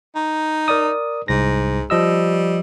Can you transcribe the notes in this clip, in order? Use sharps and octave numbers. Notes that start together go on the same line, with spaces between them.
D#4
A#4 D5 D#6
C2 G#2 A#6
F3 G3 D#5 E6